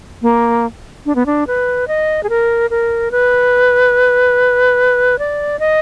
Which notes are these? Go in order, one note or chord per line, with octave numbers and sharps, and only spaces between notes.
A#3
D4
B3
D4
B4
D#5
G#4
A#4
A#4
B4
D5
D#5